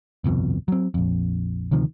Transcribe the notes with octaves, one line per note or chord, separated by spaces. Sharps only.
G1 C2 F2 B2
F#3 C4
A#1 F2
D2 C3 D#3 F3